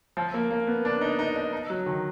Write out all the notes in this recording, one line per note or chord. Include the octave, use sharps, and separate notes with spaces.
F3
A#3
A#3
B3
D4
D#4
D#4
D#4
D#4
F#3
D#3